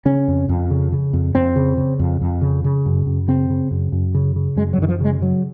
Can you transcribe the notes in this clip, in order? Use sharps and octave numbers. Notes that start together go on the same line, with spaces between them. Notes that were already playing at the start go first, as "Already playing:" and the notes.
C#3 C#4
F2
F2
C#3
C#3
F2
F2 C4
C#3
C#3
F2
F2
C#3
C#3
F#2
F#2
C#3 C4
C#3
F#2
F#2
C#3
C#3
F#2 G#3
F#3
F#2 D#3
F3
C#3 G#3
C#3 F#3